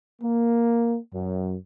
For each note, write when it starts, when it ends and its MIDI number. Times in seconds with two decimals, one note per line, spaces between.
0.22 0.97 58
1.14 1.56 42